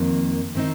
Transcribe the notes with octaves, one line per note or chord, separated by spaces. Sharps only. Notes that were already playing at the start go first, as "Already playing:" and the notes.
Already playing: F2 D#3 A#3
D#3 C4 D#4